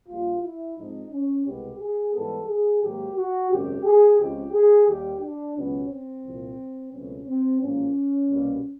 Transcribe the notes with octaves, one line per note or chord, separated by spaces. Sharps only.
A#1 A#2 G3 F4
E4
G#2 F3 G#3 C4 D#4
C#4
C2 B2 G#3 B3 G4
G#4
G#2 E3 G3 B3 A4
G#4
G#2 D#3 F#3 A#3 G4
F#4
G#1 F#2 C#3 G4
G#4
C#2 C#3 F3 G#3 C4 G4
G#4
D#2 D#3 G3 G4
D4
C#2 B2 F#3 B3 C#4
C4
C2 A#2 F3
C#2 B2 F#3 A3 C4 C#4
C4
A1 G#2 F3 A#3 C#4
C2 B2 G3 A#3